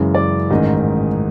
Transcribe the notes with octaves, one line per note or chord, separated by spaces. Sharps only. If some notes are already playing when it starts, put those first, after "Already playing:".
Already playing: F#2 C#3 E3 G#3
D5
A1 G#2 D#3 G#3 D#5